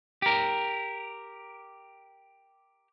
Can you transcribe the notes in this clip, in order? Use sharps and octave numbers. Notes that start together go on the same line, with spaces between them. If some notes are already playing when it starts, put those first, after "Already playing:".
G4 A#4